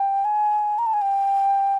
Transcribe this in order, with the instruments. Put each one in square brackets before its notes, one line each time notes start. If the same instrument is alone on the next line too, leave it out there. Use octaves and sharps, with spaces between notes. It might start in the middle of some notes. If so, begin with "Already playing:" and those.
Already playing: [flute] G5
G#5
A#5
A5
G#5
G5